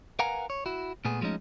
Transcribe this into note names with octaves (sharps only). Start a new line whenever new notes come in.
A#4 B4 F5 F#5 G#5 A#5
C#5
E4 F#4
A#2 A3 B3 G#4
F3 G#3 A3 C#4 D#4